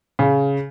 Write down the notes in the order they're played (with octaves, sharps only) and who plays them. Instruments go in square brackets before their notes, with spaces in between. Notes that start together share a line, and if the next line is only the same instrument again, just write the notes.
[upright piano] C#3